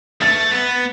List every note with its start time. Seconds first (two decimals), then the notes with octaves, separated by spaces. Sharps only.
0.21 A3 A6
0.51 B3